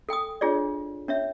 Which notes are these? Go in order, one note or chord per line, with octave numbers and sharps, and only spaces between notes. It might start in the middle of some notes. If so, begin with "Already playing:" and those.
A4 G5 G#5 D#6
D4 F4 G#4 C#5 D5
C#4 C#5 E5